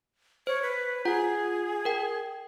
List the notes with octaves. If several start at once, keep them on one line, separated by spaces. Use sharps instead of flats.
C5 C#5
B4
F4 G#4 F#5
A#4 G5